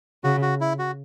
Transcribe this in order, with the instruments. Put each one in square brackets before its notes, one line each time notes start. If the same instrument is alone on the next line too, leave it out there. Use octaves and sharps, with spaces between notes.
[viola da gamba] C#3 [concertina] F#4
[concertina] F#4
E4
F#4